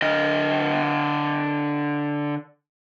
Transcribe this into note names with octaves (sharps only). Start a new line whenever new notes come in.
D3 D#5